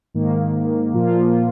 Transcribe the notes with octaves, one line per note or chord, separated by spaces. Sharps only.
G#2 D#3 A#3
A#2 F3 A#3 F4